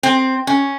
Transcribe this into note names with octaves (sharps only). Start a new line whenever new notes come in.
C4
C#4